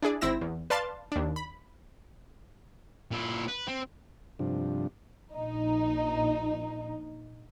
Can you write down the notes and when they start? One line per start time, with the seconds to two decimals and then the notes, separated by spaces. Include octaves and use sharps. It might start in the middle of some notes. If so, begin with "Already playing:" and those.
0.02 D4 E4 G#4 D5
0.21 G#1 C4 E4 E6 A#6 E7
0.41 E2
0.70 B4 D5 F5 A5 C6 A6
1.12 D#2 D4
1.36 B5
3.11 A#2 E4
3.48 B4
3.68 C4
4.39 G2 C3 F3 D4
5.34 A#1 D#4